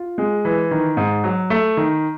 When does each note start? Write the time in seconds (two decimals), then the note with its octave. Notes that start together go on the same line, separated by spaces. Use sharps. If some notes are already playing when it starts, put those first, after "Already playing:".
Already playing: F4
0.18 G#3
0.45 E3
0.71 D#3
0.97 G#2
1.24 F#3
1.50 A3
1.77 D#3